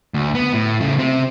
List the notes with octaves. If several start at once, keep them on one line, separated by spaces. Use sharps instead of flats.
D2
B3
A2
C#3 A3
C3 C4